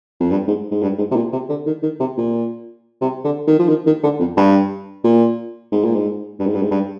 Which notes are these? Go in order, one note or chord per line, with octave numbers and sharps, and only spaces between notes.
F2
G2
G#2
G#2
G2
G#2
C3
A#2
C3
D3
D#3
D#3
C3
A#2
C3
D3
D#3
F3
D#3
D#3
D3
F2
G2
A#2
G#2
A#2
G#2
G2
G#2
G2
G#2
G2